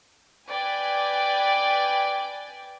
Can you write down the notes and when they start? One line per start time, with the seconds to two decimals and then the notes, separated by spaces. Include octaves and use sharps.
0.48 B4 D5 G5 G#5